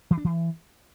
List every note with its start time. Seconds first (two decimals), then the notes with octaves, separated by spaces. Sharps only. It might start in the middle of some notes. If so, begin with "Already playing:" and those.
0.11 E3
0.18 D4
0.24 E3